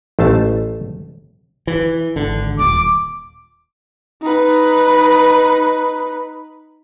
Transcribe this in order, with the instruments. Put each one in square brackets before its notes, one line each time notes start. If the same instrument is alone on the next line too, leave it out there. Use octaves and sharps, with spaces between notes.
[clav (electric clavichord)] A1 A3 C5 A5
[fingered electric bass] E3
G#1 D3
[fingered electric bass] D#1 [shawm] D6
[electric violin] D#4 B4